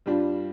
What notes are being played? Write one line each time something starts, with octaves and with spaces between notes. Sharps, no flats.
G2 G3 D4 F4